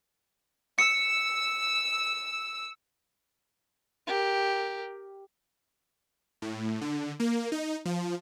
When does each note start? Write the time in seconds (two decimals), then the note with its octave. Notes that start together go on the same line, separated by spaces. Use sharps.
0.79 E6 C#7
4.07 G4 A#4
6.42 A2
6.81 D3
7.20 A#3
7.52 D#4
7.85 F3